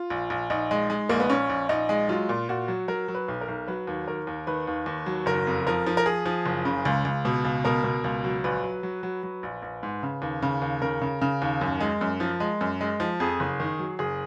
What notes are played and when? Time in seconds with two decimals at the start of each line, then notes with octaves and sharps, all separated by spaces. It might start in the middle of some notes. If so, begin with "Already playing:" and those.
Already playing: F4
0.10 A#1
0.30 A#1
0.50 A#1 D#4
0.71 G#3
0.90 G#3
1.09 A#1 A#3
1.20 B3
1.30 A#1 C#4
1.50 A#1
1.69 A#1 D#4
1.89 G#3
2.09 F#3 F4
2.29 A#2
2.49 A#2 F#4
2.68 F#3
2.88 F#3 A#4
3.08 F#3
3.15 B4
3.28 B1
3.41 A#4
3.48 B1
3.68 F#3 B4
3.87 D#2
4.07 D#2 A#4
4.27 D#2
4.47 D#3 B4
4.67 D#2
4.86 D#2
5.06 F#3
5.26 F#1 A#4
5.47 F2
5.67 F3 A#4
5.87 F3
5.97 A#4
6.06 F3 G#4
6.26 F3
6.46 F#1
6.65 C#3
6.85 C#2
7.05 C#2
7.25 B2
7.45 C#2
7.65 B2 A#4
7.84 B2
8.04 C#2
8.24 F#3
8.44 A#1 B4
8.64 F#3
8.83 F#3
9.03 F#3
9.23 F#3
9.43 A#1
9.62 A#1
9.83 G#2
10.03 C#3
10.22 D#2
10.42 C#3
10.62 D#2
10.82 C#3 A#4
11.01 C#3
11.21 C#3
11.42 D#2
11.61 F#2
11.80 G#3
12.01 F#2
12.20 F3
12.40 G#3
12.61 F#2
12.81 G#3
13.00 F3
13.20 F2 G#4
13.40 F#1
13.60 D#3
13.79 F#3
13.99 F#1 G#4